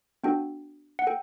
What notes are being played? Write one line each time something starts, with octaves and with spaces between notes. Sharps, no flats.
B3 D4 F#4 A4 G5
F#5
A4 G5